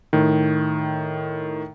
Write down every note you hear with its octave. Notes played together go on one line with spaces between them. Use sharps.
A2 D#3